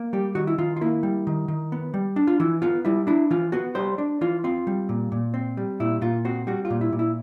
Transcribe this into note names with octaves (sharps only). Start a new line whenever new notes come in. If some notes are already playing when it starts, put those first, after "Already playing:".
Already playing: A#3
G3 G4
D#3 F#4
E4
D#3 F4
F4
A#3 E4
G3
D#3
D#3
B3
G3
D4
F4
E3 E4
B3 F4
G3 E4
D4 E4
E3 F4
B3 F#4
G3 C5
D4
E3 F4
C4 F4
G3
A#2
A#2
C4
G3
A#2 E4
A#2 F4
C4 F#4
G3 F#4
F4
A#2
E4
A#2
E4